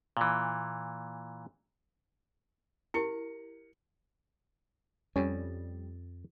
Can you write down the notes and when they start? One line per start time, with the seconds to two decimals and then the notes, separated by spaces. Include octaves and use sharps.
0.17 A#2 E3
2.94 E4 G4 A#4 C#7
5.16 F2 G3 C#4